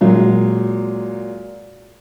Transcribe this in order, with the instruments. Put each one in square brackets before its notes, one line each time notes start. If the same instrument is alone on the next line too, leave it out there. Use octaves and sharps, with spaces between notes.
[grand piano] A#2 F#3 G#3